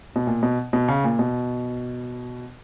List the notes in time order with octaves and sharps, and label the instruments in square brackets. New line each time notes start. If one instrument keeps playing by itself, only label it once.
[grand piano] B2
A#2
B2
B2
C#3
A#2
B2